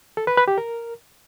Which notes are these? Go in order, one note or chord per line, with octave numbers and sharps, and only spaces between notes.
A4
B4
B4
G4
A#4